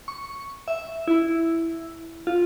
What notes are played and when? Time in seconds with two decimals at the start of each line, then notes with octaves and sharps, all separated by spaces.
0.08 C#6
0.68 E5
1.08 E4
2.27 F4